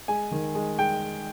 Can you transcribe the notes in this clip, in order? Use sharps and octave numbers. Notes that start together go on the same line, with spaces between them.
G#3 G#5
D#3
G#3
G#3 G5